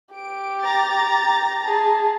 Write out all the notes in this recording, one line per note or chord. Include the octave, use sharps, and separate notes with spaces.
G4 D7
A#5 A6
G#4 A5